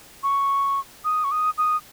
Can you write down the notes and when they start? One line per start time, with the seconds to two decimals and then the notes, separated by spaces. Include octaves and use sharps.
0.23 C#6
1.05 D#6
1.24 C#6
1.31 D#6
1.58 D#6